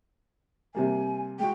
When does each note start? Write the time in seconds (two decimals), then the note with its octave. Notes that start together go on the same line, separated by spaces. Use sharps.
0.75 C3 G3 A#3 G#5
1.40 G#3 F#4 G5